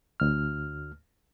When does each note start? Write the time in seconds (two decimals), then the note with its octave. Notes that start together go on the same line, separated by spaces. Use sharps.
0.20 D2 F6